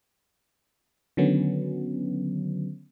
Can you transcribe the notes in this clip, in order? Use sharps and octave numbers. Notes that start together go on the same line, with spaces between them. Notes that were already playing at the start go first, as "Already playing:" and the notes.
D3 D#3 F#3 B3 C#4